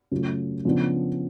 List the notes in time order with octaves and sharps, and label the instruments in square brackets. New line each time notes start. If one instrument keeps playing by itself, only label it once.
[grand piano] C#3 F#3 A3 F4
C#3 F3 B3 D4